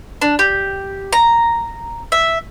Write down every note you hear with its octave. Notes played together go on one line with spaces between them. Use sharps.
D4
G4
A#5
E5